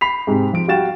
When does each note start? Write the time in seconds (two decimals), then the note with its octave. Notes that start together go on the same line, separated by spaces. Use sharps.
0.01 B5 B6 C7 F7
0.27 G#2 C3 G#3
0.53 F3 D7
0.68 G3 F#4 F5 G5 A6 E7